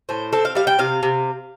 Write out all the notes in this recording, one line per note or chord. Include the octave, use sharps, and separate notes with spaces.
A2 C5
C4 A4
F5
G3 F5
G5
C3 F5
C3